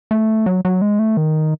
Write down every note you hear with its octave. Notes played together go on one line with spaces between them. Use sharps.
A3
F#3
F#3
G#3
A3
D#3